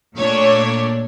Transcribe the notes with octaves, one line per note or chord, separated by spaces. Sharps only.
A#2 A3 D4 C#5